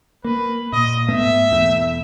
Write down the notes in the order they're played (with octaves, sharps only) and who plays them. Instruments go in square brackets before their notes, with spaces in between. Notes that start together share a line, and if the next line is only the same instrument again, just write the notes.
[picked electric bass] A#3 [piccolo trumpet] B4
[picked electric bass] A#2 [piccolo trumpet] D#5
[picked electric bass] G#2 A3 B3 [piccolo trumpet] E5
[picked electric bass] E1 E2 A3